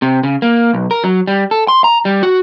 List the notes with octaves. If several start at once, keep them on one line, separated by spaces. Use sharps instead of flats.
C3
C#3
A#3
B1
A#4
F#3
G3
A4
C6
A#5
G3
F#4